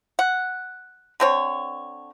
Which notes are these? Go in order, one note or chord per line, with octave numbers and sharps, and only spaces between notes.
F#5
D3 C4 C#5